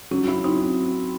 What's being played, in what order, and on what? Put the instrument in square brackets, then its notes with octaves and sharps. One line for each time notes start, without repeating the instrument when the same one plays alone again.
[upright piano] F#3 [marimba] C#4
[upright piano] E4
[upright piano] C4 [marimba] D#4